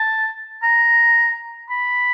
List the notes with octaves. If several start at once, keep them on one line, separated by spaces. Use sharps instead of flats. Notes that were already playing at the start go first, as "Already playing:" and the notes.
Already playing: A5
A#5
B5